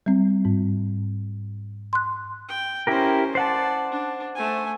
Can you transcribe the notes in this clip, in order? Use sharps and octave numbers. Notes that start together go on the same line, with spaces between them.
G3 C4
G#2
C6 F#6
G5
C#4 E4 G4 A#4 C5
C5 D5 F#5 A5
D4
A3 G#5